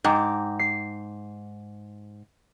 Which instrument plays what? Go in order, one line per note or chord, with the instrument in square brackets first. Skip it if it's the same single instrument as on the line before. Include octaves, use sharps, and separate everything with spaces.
[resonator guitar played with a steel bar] G#2 [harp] G5 A#5 D6
[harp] C7